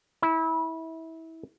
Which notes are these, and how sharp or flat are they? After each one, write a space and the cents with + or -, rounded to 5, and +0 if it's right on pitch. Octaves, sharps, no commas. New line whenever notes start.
E4 -25